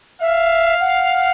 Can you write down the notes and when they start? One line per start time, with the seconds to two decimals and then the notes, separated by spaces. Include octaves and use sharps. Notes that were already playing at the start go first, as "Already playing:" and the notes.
0.21 E5 F5
0.81 F#5